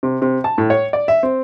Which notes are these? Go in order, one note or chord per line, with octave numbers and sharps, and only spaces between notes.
C3
C3
A5
A2
C#5
D5
E5
C4